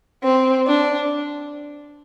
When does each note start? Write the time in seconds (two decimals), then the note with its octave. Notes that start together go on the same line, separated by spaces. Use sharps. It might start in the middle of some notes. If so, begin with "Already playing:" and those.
0.24 C4
0.67 D4